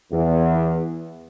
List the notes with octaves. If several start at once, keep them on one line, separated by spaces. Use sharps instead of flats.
E2